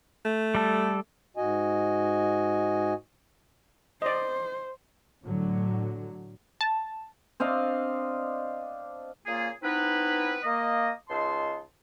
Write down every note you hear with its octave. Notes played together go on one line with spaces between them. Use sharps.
A3
G3 A4
G#2 F#4 D#5 G#5
C5 D5 D#5
A2 D3 F#3
A5
C4 D4 D#5 F5
A#2 C#3 A#3 F4 G#4
B3 C4 D#4 E4 B4
A#3 D#5
C#2 D#4 A5 C6